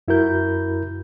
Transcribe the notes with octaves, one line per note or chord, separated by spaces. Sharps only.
F#2 E4 F#4 A#4 G6